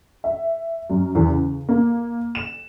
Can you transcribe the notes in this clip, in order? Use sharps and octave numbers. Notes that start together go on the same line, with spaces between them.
E5
F#2
E2
C#3
A#3
E7